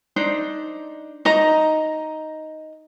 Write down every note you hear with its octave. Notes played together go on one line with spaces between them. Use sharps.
D4 D#4 C5
D#4 D#5 A#5